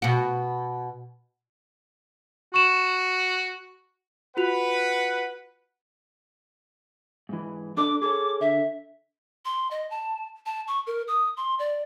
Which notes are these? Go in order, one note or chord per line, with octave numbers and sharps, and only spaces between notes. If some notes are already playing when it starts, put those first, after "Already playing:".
B2 F#4
F#4 C#6 E7
F4 F#4 B4 F#5 F7
G#2 E3
D4 A4 D5 D6
G#4 A4 C#5 D6
D3 E5
C6
D#5
A5
A5
C#6
A#4
D#6
C6
D5